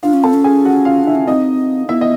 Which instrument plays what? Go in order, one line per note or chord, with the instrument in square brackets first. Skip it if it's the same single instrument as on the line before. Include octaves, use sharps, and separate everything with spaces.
[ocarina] D4 [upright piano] F4 F5
[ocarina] C#4
[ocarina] C4 [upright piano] A4 A5
[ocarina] C#4
[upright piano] G#4 G#5
F#4 F#5
F4 F5
[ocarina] D4 [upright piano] E4 E5
[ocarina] C#4
[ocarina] C4 [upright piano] D#4 D#5
[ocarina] B3 [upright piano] E4 E5
[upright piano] D#5